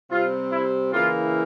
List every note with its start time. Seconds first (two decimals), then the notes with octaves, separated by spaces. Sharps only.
0.11 C3 G3 C4 F4
0.52 E4
0.93 C#3 E3 A#3 E4 F4